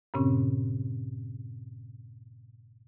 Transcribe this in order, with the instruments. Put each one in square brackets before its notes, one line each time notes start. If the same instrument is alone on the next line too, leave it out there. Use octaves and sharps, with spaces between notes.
[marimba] G2 A#2 C#3 C4 C#4